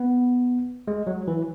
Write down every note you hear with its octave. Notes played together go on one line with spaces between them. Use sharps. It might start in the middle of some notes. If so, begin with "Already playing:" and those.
Already playing: B3
G#3
F#3
E3